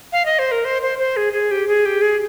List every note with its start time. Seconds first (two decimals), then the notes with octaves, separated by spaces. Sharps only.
0.12 F5
0.26 D#5
0.39 C5
0.52 A#4
0.65 C5
0.82 C5
0.99 C5
1.17 G#4
1.33 G#4
1.51 G4
1.68 G#4
1.86 G4
2.01 G#4